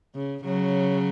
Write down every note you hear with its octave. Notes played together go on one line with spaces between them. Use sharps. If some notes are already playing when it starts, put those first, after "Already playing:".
C#3
C#3 F#3